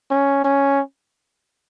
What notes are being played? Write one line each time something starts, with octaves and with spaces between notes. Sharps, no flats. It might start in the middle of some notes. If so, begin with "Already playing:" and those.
C#4
C#4